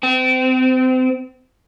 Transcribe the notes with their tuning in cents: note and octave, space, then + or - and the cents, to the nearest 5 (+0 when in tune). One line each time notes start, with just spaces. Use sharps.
C4 -30